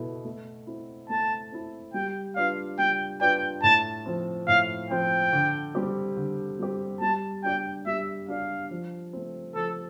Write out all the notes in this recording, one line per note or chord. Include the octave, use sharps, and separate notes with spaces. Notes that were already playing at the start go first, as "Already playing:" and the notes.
Already playing: B2 B3 E4 A4
A3
C4 E4
A3 A5
C4 E4
G3 G5
D4 F4 B4 D5 F5
G3 G5
D4 F4 B4 D5 G5
A2 A5
F3 C4
A2 F5
F3 C4 G5
D3
G3 C4 G4
D3
G3 C4 G4
G3 A5
D4 G4 D5 G5
G3 E5
D4 G4 D5 F5
F3
A3 C4
F3 A4